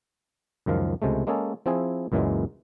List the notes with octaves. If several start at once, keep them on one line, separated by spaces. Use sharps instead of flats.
C#2 F#2 D#3 F3 F5
C#2 C3 G#3 A3
G#3 A#3 C#4 G#4 A4
F3 C4 E4 G#4 G#5
C#2 F#2 A#2 E3 F#3 G#3